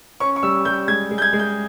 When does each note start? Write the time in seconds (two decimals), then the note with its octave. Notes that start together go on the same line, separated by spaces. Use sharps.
0.20 C#4 C#6
0.36 C#6
0.43 G3 E6
0.65 G3 G6
0.88 G#3 G#6
1.11 G#3
1.18 G6
1.22 G#6
1.33 G#3
1.39 G6